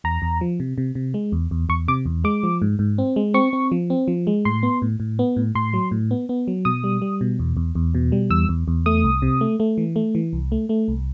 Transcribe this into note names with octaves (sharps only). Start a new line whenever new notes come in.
E2 A#5
E2
F3
C3
C3
C3
G#3
E2
E2
E2 C#6
C3 D6
E2
G#3 D6
F3
G#2
G#2
C4
G#3
C4 C#6
C4
F3
C4
F3
G#3
A2 C6
B3
A2
A2
B3
A2
A2 C6
F#3
A2
B3
B3
F#3
B2 D#6
G3
G3
B2
E2
E2
E2
B2
G3
E2 E6
E2
E2
A3 D#6
C2
C3
A3
A3
E3
A3
E3
C2
A3
A3
C2